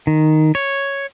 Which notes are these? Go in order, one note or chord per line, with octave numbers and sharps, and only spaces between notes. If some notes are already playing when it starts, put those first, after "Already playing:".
D#3
C#5